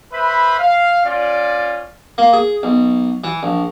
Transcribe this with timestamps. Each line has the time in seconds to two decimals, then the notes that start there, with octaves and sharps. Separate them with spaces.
0.13 B4 C5 E5 B5
0.59 F5
1.05 C#4 F4 D5
2.18 A#3
2.33 G#4
2.63 B1
3.24 E3
3.43 A#1